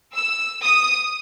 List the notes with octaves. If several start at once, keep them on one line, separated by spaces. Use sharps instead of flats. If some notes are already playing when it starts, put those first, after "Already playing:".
E6
D#6